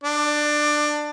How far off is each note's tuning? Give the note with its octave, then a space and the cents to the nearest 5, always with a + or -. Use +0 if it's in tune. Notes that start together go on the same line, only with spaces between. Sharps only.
D4 +20